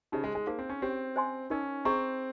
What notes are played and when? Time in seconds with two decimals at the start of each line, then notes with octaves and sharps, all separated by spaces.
0.12 C#3 D#4 G4 C5 D#5
0.24 G#3
0.35 G#3
0.47 A#3 D#4 G#4 C5 F5
0.59 C4
0.69 C#4
0.81 C4 C#4 G4 C#5
1.16 C5 D#5 G#5 C6
1.50 C#4 D#4 A#4 D#5
1.85 C4 G#4 D#5 A#5 C#6